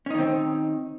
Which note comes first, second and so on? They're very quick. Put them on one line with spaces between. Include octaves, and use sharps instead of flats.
C#4 D#4 D#3 C4